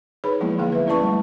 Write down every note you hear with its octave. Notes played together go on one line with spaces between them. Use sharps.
D#4 G#4 B4 C#5 B5
F3 F#3 G#3 A#3 B3 E4
D3 A#3 B3 G#4 F5
B4 E5
C#4 E4 B4 D5 A5 C#6
G3 A3